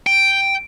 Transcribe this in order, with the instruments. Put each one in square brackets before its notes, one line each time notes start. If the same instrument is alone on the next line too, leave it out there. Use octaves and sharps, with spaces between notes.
[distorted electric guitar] G5